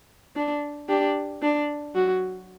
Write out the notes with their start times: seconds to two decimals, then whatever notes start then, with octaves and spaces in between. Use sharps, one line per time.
0.36 D4
0.89 D4 G4
1.43 D4
1.95 F#3 F#4